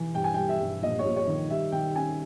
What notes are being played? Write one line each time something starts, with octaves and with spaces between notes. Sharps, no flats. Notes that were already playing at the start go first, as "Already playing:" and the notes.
Already playing: E3
G2 G5
G#5
G3 G5
E5
G2
A#1 D#5
C#5
A#1
C#5
D#3
G3 E5
D#3 G5
C#4 G#5